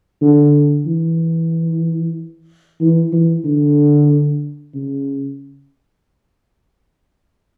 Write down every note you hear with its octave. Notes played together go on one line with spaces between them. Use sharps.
D3
E3
E3
E3
D3
C#3